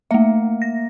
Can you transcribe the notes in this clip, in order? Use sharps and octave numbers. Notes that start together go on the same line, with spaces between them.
A3 A#3 E5
A#6